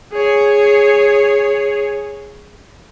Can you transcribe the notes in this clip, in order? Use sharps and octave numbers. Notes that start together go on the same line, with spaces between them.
G#4 C#5